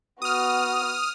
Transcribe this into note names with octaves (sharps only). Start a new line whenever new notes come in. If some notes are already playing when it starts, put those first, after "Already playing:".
B3 F#4 D#6 F6